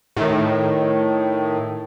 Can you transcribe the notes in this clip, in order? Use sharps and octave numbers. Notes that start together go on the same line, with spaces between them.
A2 D#3